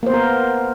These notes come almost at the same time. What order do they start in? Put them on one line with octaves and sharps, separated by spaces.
A#3 C5 B3 A#4